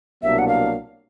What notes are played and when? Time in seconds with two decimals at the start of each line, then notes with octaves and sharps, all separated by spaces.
0.23 C2 B2 F#3 A#3 D4 E5
0.39 F#5
0.48 F5